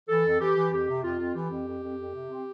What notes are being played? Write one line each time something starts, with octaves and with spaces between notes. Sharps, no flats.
E3 A4
F2
E3 G4
E3
F2 G4
C3
F2 F4
F2
E3 G4
F2
F2
F2
F2
C3
C4